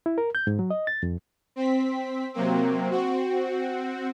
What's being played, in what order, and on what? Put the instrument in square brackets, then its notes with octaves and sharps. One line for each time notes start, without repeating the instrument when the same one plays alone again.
[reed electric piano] E4
A#4
G6
G#2
F#3
D#5
A6
F2
[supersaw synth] C4 B6
C3 F#3 A#3 C4
C4 F#4